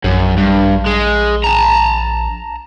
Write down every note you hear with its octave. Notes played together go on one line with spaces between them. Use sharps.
A#1 F#2
G2
G#3
A5 A#5